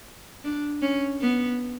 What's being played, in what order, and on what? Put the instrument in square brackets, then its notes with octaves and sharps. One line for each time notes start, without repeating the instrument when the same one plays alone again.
[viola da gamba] D4
C#4
B3